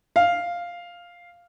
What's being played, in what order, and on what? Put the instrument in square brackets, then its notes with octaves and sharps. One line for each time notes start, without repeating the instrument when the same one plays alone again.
[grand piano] F5